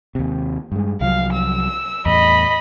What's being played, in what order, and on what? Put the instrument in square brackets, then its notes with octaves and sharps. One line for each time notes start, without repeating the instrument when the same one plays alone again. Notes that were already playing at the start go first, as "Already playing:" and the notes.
[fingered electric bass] D#2 C3
G2 G#3
[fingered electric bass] C2 F3 F#3 [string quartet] F5
[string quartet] E6
[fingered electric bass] E2 A2 [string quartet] D#5 B5